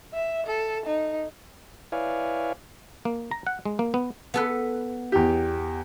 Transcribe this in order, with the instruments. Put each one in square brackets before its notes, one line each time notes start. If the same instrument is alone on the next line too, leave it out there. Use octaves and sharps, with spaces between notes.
[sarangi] E5
A4
D#4
[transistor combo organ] E4 B4 C#5 D5 F5 G#5
[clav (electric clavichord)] A#3
A#5
F#5
G#3
A#3
B3
[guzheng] B3 A4 B4
[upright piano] E2 G4